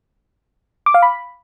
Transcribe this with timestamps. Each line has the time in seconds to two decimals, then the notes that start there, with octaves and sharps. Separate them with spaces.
0.86 D6
0.94 F5
1.02 B5